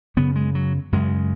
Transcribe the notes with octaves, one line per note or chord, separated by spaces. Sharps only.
F#2 C#3 B3
G#3
F#3
F#2 C#3 G#3